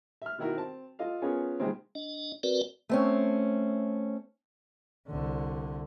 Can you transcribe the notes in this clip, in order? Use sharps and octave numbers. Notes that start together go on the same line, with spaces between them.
E5 F6
B2 D#3 E4 F#4 A#4
C4 A5
F4 A4 D#5 F5
B3 C#4 F4 G#4 A#4 C#5
C3 D#3 G3 G#3 A#3 C4
D4 D#5
C4 F#4 A#4 B4 D5
A3 C4 C#4
C2 D3